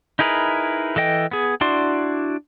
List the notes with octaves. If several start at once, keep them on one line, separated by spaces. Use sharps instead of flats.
D#4 E4 G#4 A#4 B4
E3 A4 D#5 G5
B3 G#4
D4 E4 F#4 D5 C6